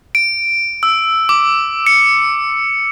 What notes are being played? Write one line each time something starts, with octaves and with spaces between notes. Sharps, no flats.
D7
E6
D6
C#7